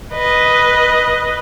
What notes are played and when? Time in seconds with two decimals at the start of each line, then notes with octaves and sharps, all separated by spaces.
0.13 B4 D#5